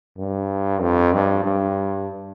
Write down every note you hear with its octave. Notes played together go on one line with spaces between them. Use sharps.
G2
F2
G2
G2